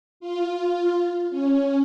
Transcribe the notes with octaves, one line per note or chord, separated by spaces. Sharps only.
F4
C#4